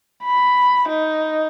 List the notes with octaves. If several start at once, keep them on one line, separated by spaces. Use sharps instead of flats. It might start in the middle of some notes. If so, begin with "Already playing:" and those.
B5
D#4